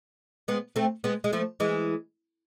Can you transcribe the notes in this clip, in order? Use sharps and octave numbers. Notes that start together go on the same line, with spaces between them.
G#3 B3
A3 C4
G#3 B3
G#3
F3 A3
E3 G#3